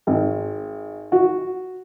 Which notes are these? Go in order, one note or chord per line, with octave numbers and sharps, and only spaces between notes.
G#1
F#4